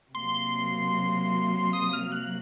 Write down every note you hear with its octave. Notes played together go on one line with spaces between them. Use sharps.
C3 F#3 A#3 C6
D#6
F6
F#6